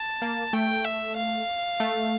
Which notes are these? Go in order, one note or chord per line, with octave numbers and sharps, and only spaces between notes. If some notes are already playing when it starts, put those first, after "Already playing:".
Already playing: A5
A#3
A3 G5
E5
F5
A3